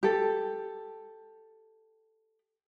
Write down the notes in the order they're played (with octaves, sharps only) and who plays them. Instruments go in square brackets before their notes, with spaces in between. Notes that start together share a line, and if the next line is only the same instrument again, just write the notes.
[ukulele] G4 A4